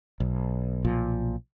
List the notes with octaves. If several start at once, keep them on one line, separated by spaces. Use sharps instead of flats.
B1
B1 A#2 F3